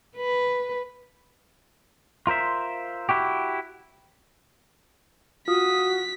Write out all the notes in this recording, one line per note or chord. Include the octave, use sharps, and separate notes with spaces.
B4
F4 A#4 C5 E5
E4 F#4 G4
F4 F#4 D#6 B6